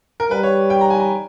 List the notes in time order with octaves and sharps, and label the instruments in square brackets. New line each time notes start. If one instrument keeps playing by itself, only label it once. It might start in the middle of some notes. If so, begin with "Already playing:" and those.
[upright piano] A#4
[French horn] G3 [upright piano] B4
[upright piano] C#5
G5
A#5
G#5
A#5